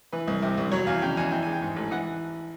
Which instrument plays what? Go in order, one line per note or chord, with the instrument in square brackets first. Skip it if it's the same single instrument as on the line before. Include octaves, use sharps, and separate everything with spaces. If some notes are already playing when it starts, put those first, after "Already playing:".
[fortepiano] E3 B4
C2
C3
C2
F#3 C#5
E2 F5
C#3 G5
E2 G#5
E3 G5
G#3 G#5
G5
G#2
A1
E3 F#5